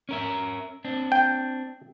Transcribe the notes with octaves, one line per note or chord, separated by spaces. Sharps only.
C#4 A#4 E5
C4 D4
G5